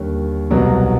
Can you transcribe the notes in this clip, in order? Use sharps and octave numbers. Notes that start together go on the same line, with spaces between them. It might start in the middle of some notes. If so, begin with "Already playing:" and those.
Already playing: D#2 D3 G3 A#4 C#5
C2 B2 F#3 B3